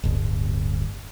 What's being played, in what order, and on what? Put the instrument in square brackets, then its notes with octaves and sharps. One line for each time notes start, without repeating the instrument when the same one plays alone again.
[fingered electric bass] D1 G1